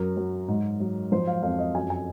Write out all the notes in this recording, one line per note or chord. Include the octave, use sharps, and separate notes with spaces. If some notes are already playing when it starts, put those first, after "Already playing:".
Already playing: F#2 F#3 A#4
F#3
G#2
F#3
F3 C5
F5
F2 F5
D#5
F#2 G#5
G#5